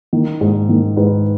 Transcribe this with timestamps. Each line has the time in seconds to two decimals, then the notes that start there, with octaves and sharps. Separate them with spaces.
0.13 D#3
0.41 G#2
0.69 D#3
0.97 G#2 B4